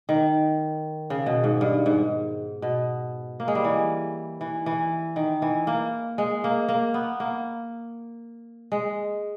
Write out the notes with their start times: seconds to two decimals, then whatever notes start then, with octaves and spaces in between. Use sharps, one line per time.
0.09 D#3
1.10 C#3
1.26 B2
1.44 G#2
1.61 G2
1.86 G#2
2.62 B2
3.40 A#3
3.48 G#3
3.55 G3
3.64 E3
4.41 E3
4.66 E3
5.16 D#3
5.42 E3
5.67 A#3
6.18 G#3
6.44 A#3
6.69 A#3
6.94 B3
7.20 A#3
8.72 G#3